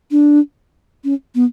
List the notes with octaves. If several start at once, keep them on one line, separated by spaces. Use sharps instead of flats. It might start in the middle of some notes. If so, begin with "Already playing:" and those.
D4
C#4
B3